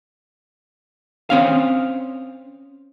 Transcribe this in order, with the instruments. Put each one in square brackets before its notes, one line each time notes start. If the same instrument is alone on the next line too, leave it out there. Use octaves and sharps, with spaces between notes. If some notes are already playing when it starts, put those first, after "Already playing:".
[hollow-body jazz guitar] C4 C#4 F5